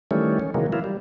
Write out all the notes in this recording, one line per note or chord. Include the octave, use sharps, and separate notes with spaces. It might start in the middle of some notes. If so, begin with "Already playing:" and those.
D#3 E3 G3 A3 C#4
C#4
C3 D#3 E3 F#3 G#3 A#3
E3 F#3 A#3 E4 F4
G3